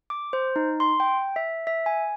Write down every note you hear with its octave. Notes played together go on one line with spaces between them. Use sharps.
D6
C5
D#4
C6
G5
E5
E5
G#5